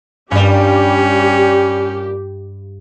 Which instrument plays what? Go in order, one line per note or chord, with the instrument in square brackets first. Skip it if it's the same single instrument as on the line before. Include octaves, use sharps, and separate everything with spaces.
[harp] G2 [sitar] A#2 G3 [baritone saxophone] C#4 [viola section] G4